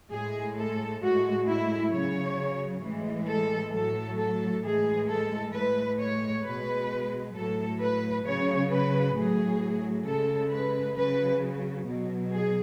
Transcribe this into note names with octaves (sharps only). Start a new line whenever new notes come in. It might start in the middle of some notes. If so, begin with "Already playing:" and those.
A2 G#3 G#4
A4
A2 G#3 F#4
E4
C#3 F#3 C#5
A2 E3 G#3
A4
A2 F#3 A4
A4
A2 E3 G#3 G#4
A4
A2 G#3 B4
C#5
B2 G#3 B4
A2 F#3 A4
B4
C#3 F#3 C#5
B4
A2 F#3 G#4
C#3 G#3 A4
B4
C#3 F#3 B4
B2 F#3
G#4